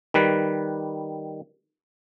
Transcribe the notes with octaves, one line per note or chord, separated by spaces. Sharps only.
D#3 G3 B4